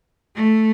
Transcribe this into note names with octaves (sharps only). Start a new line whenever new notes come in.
A3